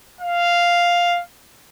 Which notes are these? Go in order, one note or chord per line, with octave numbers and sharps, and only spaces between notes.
F5